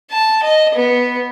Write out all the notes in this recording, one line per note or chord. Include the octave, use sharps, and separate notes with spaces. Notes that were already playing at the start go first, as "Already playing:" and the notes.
A5
D#5
B3